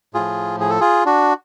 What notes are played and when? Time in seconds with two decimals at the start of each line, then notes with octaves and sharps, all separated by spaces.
0.14 A2 F3 F4 G#4
0.60 G#4
0.70 A4
0.80 F4 G#4
1.05 D4 F#4